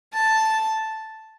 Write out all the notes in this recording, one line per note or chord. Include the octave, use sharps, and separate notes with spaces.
A5